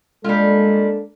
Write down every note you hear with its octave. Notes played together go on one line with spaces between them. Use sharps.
G3 G#3 A#3 D4 F4 A4